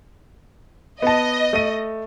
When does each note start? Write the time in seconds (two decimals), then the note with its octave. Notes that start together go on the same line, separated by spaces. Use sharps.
1.02 B3 D#5 A5
1.53 A3 D#7